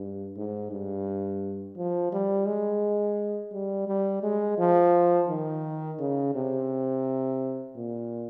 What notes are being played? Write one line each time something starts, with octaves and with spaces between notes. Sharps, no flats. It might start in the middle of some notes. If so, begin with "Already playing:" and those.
Already playing: G2
G#2
G2
F3
G3
G#3
G3
G3
G#3
F3
D#3
C#3
C3
A#2